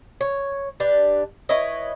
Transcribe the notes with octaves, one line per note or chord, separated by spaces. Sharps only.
C#5
D4 G4 B4
E4 B4 C#5 D#5